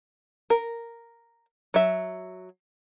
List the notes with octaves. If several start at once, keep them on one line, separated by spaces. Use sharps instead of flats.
A#4
F#3 E5